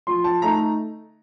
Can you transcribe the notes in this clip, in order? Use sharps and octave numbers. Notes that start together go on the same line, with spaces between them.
F3 C6
A5
A3 D#4 A#5